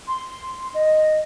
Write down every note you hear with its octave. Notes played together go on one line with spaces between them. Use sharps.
C6
D#5